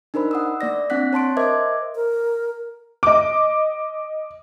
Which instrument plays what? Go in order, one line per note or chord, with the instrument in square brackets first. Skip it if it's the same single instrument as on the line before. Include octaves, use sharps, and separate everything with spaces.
[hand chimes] D4 D#4 A#4 C5 B5
F#5 D#6 E6
A#3 D5 A#6
C4 D4 F#5 F#6 B6
C#5 A5 C6 D7
A#4 C5 D#5 E5 D6 G#6
[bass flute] A#4
[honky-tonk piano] D#5 D6